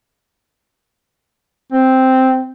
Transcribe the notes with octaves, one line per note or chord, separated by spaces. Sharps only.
C4